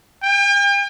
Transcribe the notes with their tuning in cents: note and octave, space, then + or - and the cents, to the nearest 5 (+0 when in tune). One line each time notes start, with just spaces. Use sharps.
G5 +40